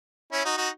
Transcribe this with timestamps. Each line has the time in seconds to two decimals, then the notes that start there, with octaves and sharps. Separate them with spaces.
0.32 C#4 E4
0.45 D#4 F#4
0.57 D#4 F#4